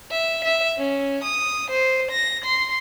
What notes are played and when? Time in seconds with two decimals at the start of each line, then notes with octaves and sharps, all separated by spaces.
0.11 E5
0.45 E5
0.77 C#4
1.24 D#6
1.70 C5
2.11 A#6
2.45 C6